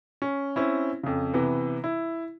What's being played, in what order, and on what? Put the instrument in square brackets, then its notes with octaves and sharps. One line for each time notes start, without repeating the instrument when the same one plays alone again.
[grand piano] C#4
C4 C#4 E4
F2 C#3
C3 E3 B3
E4